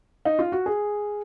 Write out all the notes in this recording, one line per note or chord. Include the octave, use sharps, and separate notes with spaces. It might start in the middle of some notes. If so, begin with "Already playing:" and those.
D#4
F4
F#4
G#4